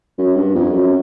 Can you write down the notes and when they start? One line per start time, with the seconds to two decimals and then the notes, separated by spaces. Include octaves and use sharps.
0.18 F#2
0.36 G2
0.55 F2
0.74 F#2